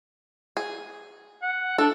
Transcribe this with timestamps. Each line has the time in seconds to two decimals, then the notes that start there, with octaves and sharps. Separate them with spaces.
0.57 G#4
1.43 F#5
1.78 D4 A4